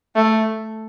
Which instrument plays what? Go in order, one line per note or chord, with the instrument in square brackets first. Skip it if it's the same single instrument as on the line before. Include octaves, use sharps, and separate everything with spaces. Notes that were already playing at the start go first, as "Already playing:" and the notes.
[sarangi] A3